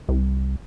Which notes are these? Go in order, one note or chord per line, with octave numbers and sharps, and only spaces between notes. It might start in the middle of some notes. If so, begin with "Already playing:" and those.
C2